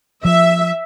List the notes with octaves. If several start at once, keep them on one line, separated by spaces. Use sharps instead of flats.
F3 E5